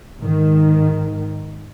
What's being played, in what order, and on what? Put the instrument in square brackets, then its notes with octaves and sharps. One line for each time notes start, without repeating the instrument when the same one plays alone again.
[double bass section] G#2 D#3